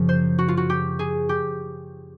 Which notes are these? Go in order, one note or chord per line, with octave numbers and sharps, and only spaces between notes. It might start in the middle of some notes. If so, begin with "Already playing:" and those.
Already playing: F#2 C#3 F3 A#3
C5
F#4
F4
F#4
G4
G#4
G4